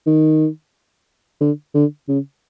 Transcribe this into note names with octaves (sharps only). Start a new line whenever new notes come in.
D#3
D3
D3
C#3